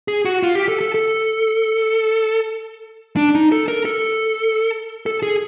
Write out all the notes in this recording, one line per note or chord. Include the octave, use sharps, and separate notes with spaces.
G#4
F#4
F4
G4
A4
A4
A4
D4
D#4
A4
A#4
A4
A4
G#4